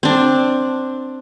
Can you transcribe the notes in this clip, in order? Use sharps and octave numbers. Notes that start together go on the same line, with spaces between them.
C4 D4